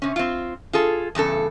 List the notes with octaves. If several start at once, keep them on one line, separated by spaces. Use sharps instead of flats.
C3 C#4
C4 F4
F4 G#4 A4
E2 G2 C#3 A4